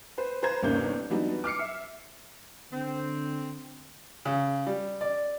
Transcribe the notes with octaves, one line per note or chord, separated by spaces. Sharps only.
B4 C5
B4 C5 A#5 G#6
G1 D#2 C3 A#3 C#4 G6
E3 F#3 G3 B3 D4 D#4
D6 F6 C7 C#7
E5
D3 C4
C#3
G3
D5